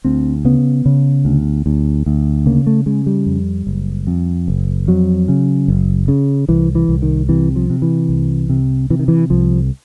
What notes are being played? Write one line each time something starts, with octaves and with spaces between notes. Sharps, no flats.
D2 C4
C#3 B3
C#3
D2
D2
D2
C#3 A#3
A3
C#3 G#3
G3
F2
F#1
F2
F#1
F2 F#3
C#3
F#1
C#3
C2 E3
E3
C2
D#3
C3 E3
F3
C3
E3
C2
C3
C3 E3
D#3
E3
C2 F3